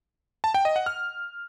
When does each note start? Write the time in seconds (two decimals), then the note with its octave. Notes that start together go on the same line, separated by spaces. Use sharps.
0.44 A5
0.54 G5
0.65 D#5
0.76 F#5
0.86 F6